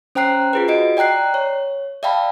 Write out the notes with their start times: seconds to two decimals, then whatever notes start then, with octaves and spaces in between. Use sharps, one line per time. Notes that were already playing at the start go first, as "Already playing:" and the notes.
0.15 C#4 C5 G5 A#5 F#6 C7
0.53 F4 G#4 B4
0.68 F#4 D#5 D7
0.97 D5 G5 A#5 F#6 C7
1.34 C#5
2.03 D5 E5 F5 G5 A5 B5